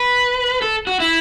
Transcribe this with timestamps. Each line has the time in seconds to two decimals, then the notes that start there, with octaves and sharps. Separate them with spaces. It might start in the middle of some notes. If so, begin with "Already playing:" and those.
Already playing: B4
0.62 A4
0.87 F#4
1.00 E4